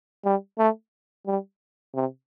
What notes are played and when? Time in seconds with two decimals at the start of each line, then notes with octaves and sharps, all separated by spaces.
0.25 G3
0.58 A3
1.26 G3
1.95 C3